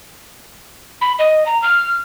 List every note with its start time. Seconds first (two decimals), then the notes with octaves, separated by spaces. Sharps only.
1.01 B5
1.19 D#5
1.46 A#5
1.62 F6